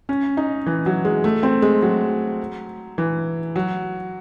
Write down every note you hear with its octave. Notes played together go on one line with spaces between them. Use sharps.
C#4
D#4
E3
F#3
G#3
A3
C4
G#3
F#3
E3
F#3